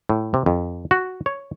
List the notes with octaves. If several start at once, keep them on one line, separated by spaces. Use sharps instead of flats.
A2
C3
F2
F#4
C#5